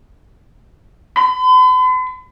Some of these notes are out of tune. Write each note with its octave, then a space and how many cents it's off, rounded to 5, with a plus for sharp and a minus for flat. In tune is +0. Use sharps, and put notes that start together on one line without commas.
B5 +45